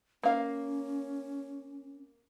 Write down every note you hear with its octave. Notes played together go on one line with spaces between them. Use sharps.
A#3 C#4 F5